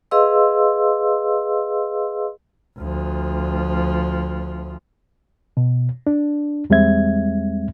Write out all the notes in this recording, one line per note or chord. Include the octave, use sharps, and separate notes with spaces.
G#4 B4 D#5 F5 C6 E6
D2 F3
B2
D4
E2 G3 G#3 C4 E5 G#6